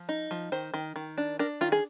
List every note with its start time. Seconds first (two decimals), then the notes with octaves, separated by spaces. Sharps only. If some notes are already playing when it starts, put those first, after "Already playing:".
Already playing: F3
0.09 D#4
0.31 F3
0.52 D#3 C5
0.74 D#3
0.96 D#3
1.18 D4
1.39 D4 A#4
1.61 D#3 F4
1.72 G#4